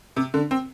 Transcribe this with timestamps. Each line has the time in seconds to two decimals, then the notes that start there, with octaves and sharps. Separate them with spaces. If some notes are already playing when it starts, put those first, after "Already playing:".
0.16 C3
0.34 D3
0.51 C4